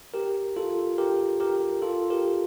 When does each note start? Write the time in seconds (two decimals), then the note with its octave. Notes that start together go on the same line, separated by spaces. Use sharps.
0.14 G4 A#4
0.57 F4 A4
0.98 G4 A#4
1.40 G4 A#4
1.82 F4 A4
2.10 G4 A#4